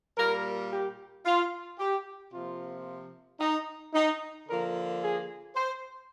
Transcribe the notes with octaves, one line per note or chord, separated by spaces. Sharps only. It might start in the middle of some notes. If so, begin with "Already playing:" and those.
A#2 G3 A#3 A#4
G4
F4
G4
C3 F3 A#3 F4
D#4
D#4
D3 F3 A#3 A#4
G#4
C5